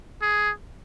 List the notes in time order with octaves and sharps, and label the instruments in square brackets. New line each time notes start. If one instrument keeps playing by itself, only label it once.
[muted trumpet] G#4